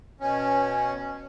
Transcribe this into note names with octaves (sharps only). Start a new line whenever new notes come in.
B2 C#4